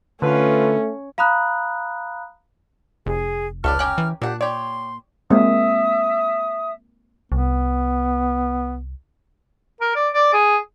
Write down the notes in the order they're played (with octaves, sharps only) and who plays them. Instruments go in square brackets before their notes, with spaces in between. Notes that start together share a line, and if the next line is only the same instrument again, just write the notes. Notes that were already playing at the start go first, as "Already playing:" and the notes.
[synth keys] D3 [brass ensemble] A3 [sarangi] C#4 [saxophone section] F4 B4
[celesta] F5 A#5 B5 D#6 F#6
[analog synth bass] F1 [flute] G#4
[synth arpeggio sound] C#2 C#6 [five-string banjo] A4 B4 D5 [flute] F6
[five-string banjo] C#4 G4 A#4 [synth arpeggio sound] G5 F#6
[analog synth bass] E3
[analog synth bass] A#2 [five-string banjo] D4 F#5 [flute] G4
[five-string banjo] G4 C#5 [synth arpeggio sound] D5 [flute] C6
[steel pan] G#3 A#3 C4 [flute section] E5 D#6
[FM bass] C2 [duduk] B3
[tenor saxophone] A#4
D5
D5
G#4